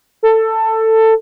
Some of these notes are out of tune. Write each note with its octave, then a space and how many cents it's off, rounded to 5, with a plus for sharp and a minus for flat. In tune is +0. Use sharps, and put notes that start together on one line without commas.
A4 +15